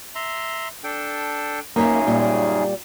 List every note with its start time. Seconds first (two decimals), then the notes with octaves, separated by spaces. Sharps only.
0.15 E5 A#5 C6
0.84 D4 A4 G5
1.76 F#2 C#3 A#3 D#4 G#4 C#5 E5
2.07 A#2 G3